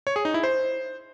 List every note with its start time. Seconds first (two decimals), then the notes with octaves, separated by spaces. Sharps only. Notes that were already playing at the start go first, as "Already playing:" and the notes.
0.07 C#5
0.16 G#4
0.25 D#4
0.34 E4
0.43 C5